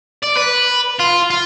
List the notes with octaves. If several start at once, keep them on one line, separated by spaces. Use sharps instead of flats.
D5
B4
F4
F4